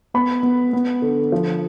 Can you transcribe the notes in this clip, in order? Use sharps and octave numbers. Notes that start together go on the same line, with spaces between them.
B3 B5
B3
B3
D3
F3